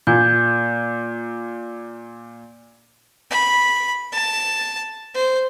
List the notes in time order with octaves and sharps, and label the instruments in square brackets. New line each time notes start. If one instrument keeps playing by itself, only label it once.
[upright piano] A#2 [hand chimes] G6 G#6
[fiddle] B5
A5
C5